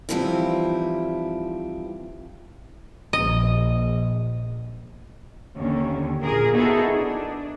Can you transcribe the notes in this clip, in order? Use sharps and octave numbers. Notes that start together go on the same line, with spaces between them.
E3 F3 G3 C4 D#4 E4
A#1 D#5
D#2 D3 C#4
A#2 G#4 A#4
B3 D#4 E4 F#4 G#4 A4
D4